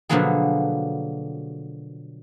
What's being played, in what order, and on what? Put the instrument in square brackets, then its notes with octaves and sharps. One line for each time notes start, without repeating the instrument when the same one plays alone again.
[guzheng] B2 D3 F3 F#3 A#3 G#4